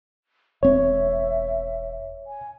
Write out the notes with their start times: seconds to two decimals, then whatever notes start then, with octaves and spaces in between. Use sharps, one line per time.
0.63 E1 C4 C#5 E5
2.27 G#5